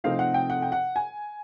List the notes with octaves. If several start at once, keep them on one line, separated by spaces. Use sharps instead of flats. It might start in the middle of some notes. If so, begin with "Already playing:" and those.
C3 F3 A3 C4 D#4 F5
F#5
G5
F#5
G5
F#5
G#5